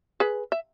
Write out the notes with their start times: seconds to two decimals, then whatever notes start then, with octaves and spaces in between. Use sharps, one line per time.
0.20 G#4 B4
0.52 E5